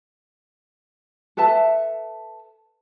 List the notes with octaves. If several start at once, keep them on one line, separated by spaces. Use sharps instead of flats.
A4 B4 E5 A5